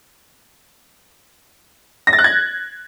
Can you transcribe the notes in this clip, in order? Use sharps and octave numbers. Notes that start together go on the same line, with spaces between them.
A#6
A6
F#6
G#6